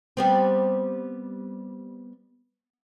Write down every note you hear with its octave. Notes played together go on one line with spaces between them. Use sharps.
G3 B3 C4